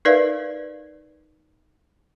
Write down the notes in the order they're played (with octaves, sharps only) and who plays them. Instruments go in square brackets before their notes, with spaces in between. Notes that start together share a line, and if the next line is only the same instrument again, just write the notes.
[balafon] D#4 A#4 B4 D5 E5 F5